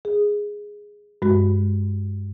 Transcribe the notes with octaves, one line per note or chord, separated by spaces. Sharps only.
G#4
G2 G#3 F#4